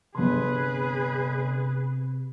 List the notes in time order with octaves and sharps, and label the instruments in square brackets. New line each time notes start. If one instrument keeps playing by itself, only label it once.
[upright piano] G1 C6 [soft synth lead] C3 [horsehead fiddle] G#4 B4